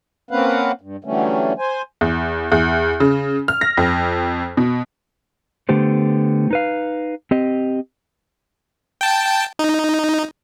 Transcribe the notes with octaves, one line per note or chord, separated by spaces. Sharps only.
A#3 C4 C#4 B4 F5 F#5
G2
D3 E3 F#3 G3 A3 C#4
C5 G#5
E2
E2
C#3
F6
A#6
F2
B2
D3 A3 B3 G4 C5
D#4 B4 F5
C4 G4 D#5
G5 A5
D#4